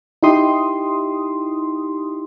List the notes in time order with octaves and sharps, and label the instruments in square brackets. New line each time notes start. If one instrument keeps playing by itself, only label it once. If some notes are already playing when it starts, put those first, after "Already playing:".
[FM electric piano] D#4 E4 G4 C6 D#6